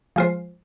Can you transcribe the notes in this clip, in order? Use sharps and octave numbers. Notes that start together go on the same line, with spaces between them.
F3 G#3 F4 C5